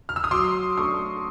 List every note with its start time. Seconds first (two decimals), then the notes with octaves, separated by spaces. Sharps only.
0.09 F6
0.16 E6
0.24 D#6
0.31 F#3 C6 D6
0.77 A3 D4 C#6 D#6